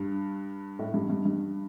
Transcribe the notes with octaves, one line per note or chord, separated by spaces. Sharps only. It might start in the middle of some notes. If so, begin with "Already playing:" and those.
Already playing: G2
A2
G2
G2
G2